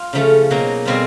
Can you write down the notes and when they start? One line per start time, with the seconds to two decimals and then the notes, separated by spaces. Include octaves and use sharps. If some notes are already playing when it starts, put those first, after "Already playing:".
Already playing: F4
0.13 C#3 F3 A3 C#4
0.50 B2 F#3 A#3 D#4
0.85 B2 G3 C4 F4 G#4